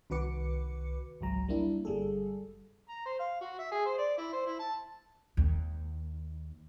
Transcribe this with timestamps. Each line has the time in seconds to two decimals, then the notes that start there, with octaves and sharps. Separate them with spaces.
0.10 C2 D#3 F#4 B4 D6 C#7
1.21 G#1 C#2 F#3 A#5
1.48 G3 A#3 D4 E4
1.85 G1 G3 G#4 A4
2.89 A#5
3.06 C5
3.19 F5
3.41 F#4
3.59 E5
3.72 G#4
3.86 C5
3.98 D5
4.18 E4
4.33 C5
4.46 E4
4.59 A5
5.37 D#2